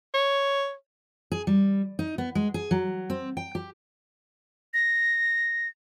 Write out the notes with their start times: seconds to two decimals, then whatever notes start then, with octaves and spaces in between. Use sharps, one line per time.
0.14 C#5
1.32 G#4
1.47 G3
1.99 D#4
2.18 B3
2.35 G#3
2.54 G#4
2.71 F#3
3.10 C4
3.37 G5
3.55 G4
4.74 A#6